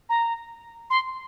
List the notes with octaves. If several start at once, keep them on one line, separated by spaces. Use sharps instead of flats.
A#5
C6